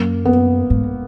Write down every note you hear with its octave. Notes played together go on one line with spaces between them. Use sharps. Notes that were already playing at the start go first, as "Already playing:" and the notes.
Already playing: F#2 A#3
B3
G#2